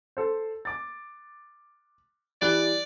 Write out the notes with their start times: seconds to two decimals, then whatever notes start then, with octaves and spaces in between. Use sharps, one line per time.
0.17 A4 C5
0.65 D6 A6
2.42 E3 G3 D5 F#6